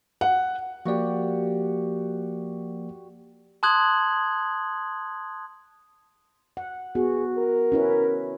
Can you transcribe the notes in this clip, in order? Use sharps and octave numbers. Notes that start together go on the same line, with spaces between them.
F#5
F3 A#3 F#4 G4 D5
A5 C6 D#6 F#6 G#6 F#7
F#5
B3 F#4 G#4
A#4
C#4 E4 B4